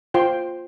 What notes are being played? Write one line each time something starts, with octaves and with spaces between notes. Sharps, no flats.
F4 C5 G5 C6